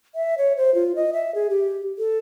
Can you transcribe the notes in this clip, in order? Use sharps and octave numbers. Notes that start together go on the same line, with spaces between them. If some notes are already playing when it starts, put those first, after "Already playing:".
E5
C#5
C5
F4
D#5
E5
G#4
G4
A4